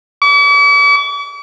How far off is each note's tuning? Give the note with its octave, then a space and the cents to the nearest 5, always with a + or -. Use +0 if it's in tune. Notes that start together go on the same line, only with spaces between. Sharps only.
D6 -45